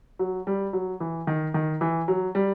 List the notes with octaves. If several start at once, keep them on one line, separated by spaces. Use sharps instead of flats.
F#3
G3
F#3
E3
D#3
D#3
E3
F#3
G3